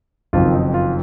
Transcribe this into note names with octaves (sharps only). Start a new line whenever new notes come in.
F#1 F2 D#3 F#3 C4 F4
D#4
F4